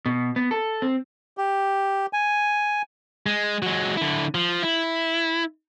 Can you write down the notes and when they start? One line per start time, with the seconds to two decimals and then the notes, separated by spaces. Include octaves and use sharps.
0.06 B2
0.36 B3
0.51 A4
0.82 C4
1.37 G4
2.13 G#5
3.26 G#3
3.63 F#3 G#3
3.97 D3 E4
4.35 F3
4.63 E4